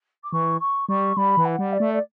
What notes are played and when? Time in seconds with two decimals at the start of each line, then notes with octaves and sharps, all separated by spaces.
0.23 D6
0.32 E3 C#6
0.60 C#6
0.89 G3 C#6
1.17 G3 B5
1.37 E3
1.45 F#5
1.59 G3
1.73 D5
1.80 A3
1.93 D5